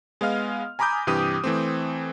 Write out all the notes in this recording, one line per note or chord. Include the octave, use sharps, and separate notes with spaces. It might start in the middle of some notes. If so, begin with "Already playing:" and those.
G#3 B3 D#5 F5 F6
G#5 A#5 B5 D6 D#6 G6
G2 C3 E3 G4 D#6 D#7
E3 A3 C4